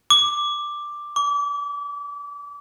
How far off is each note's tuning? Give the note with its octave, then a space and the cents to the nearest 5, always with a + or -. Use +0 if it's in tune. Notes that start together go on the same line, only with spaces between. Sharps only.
D6 +5
D6 -30